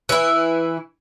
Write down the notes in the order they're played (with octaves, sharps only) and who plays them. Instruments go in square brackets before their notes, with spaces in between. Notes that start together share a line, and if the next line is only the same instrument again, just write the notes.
[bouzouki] E3 E4